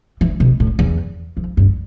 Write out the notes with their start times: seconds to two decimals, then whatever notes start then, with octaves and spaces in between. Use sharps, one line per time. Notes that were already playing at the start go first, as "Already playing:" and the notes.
0.21 E3
0.40 B2
0.60 A2
0.79 E2
1.37 F2
1.57 G2